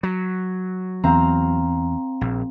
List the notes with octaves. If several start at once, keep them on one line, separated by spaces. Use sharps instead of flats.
F#3 B6 C7
E2 C4 F5 A#5
A#1